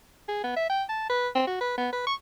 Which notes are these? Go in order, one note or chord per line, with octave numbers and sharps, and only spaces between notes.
G#4
B3
E5
G5
A5
B4
C4
F#4
B4
B3
B4
C#6